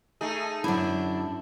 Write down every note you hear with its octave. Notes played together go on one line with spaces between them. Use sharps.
A3 D#4 G#4
F#2 D3 D4 E4